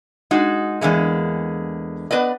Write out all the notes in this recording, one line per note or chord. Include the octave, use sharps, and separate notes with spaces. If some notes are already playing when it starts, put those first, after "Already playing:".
G#3 D#4 F#4
E2 D3 G#3 A#3
B3 B4 D5 D#5